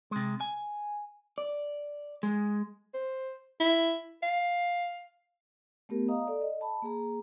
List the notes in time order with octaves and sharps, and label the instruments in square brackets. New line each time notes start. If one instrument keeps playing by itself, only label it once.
[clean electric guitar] C3 G#3
G#5
[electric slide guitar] D5
G#3
[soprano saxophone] C5
E4
F5
[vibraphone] A3 B3 G4 A#4
D#5 F5 A#5 D#6
A4 D5
D#5
A5 B5
A#3 G#4 A#5